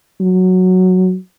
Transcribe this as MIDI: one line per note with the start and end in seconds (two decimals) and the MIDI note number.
0.20 1.16 54